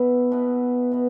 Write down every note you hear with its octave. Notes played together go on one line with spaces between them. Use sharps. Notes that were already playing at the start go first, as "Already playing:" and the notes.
Already playing: B2 B3 E4
B2 B3 E4
B2 B3